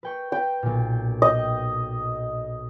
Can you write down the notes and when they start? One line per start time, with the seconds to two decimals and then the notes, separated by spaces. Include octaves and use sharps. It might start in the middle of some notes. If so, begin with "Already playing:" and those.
0.03 B4 G5 C#6
0.32 B4 G5
0.63 B1 A#2
1.22 D#5 G5